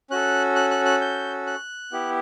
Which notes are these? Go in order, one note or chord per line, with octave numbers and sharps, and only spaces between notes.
C#4 F#4 A4 F#6
F#6
F#6
F#6
G6
F#6
B3 E4 G4